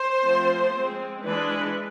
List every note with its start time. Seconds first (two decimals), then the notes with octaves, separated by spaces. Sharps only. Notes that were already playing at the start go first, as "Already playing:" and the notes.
Already playing: C5
0.22 F3 A3 C4
0.73 G#3 C4
1.24 E3 G#3 D4 B4